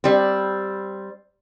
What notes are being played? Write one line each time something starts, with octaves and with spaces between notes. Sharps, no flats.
G3 C4